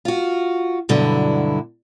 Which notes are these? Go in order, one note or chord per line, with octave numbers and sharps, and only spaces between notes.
F4 F#4
G2 B2 D3 F#3 E4